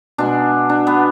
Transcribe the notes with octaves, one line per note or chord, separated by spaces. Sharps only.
B2 G#3 D4
D4
B3